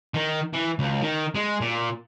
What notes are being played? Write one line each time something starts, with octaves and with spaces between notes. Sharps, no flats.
D#3
E3
C#2
D#3
G#3
A#2